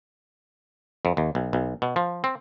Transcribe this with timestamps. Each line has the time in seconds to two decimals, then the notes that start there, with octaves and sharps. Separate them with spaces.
1.05 F2
1.17 D#2
1.35 B1
1.53 B1
1.82 B2
1.96 F3
2.24 C4